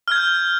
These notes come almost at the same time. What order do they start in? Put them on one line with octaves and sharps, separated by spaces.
F6 G#6 G6